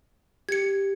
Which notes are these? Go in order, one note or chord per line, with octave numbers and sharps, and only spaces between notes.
G4 G#6 C#7